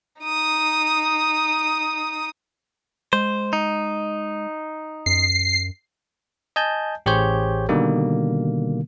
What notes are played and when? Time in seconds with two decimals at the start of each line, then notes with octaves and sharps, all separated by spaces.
0.22 D#4 D#6
3.13 G#3 C5
3.53 D#4
5.06 F#2 C7
6.56 D#5 G#5 A5 G6
7.06 A1 G4 G#4 C5 C#5 G6
7.69 B2 D3 D#3 G3 A#3